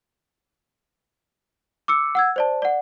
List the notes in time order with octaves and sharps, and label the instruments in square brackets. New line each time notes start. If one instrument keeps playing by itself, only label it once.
[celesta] D6 E6 C#7
F#5 E6 G#6
C5 D5 A5
D5 F#5